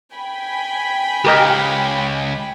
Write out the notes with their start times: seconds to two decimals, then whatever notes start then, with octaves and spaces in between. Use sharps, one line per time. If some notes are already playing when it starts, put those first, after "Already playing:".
0.14 G5 G#5 B5
1.24 C#2 G4 A#4 D#5